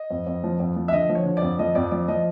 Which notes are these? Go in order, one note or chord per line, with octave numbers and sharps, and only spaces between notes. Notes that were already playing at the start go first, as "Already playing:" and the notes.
Already playing: D#5
F2
F2
F3
F2
F3
E5
D3 D#5
F3
C#5
D3
F2 D5
F3 D#5
F2 D5
F3 D5
F3 D#5